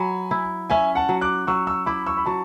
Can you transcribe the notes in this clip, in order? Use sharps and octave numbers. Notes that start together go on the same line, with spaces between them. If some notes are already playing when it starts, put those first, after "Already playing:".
Already playing: F#3 G#5 B5
E4
C#4 E5 G#5
F#5 A5
F#3
D6 F#6
F#3 C#6 E6
C#6 E6
E4 B5 D6
C#6 E6
B5
F#3 A5 C#6